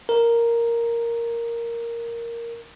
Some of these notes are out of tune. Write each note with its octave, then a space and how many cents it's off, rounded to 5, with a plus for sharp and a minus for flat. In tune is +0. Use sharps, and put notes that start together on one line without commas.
A#4 +0